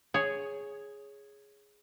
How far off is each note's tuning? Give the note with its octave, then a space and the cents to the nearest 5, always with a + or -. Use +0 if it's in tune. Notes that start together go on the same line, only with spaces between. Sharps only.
G#4 +0 C#5 +0